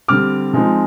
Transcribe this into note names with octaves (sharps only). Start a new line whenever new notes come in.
D3 G3 C4 D6 F6
F3 G#3 C4 D#4